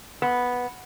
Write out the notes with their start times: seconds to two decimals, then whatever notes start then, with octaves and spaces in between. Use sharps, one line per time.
0.22 B3